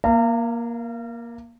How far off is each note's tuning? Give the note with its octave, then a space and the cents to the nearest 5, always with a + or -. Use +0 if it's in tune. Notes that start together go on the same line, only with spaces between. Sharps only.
A#3 +15 F5 -35 A#5 -35